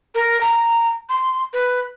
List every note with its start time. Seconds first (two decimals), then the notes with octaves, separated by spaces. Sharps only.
0.14 A#4
0.40 A#5
1.09 C6
1.53 B4